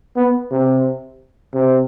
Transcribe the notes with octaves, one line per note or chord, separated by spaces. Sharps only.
B3
C3
C3